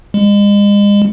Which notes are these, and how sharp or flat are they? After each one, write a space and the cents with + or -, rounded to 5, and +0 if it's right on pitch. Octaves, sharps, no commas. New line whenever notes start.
G#3 -35